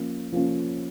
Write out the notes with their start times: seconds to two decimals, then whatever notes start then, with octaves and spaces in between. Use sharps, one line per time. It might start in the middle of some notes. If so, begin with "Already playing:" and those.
Already playing: F3 A#3 C#4
0.32 F3 A#3 C#4